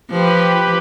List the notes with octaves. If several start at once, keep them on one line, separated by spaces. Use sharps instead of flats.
F3 G4 B4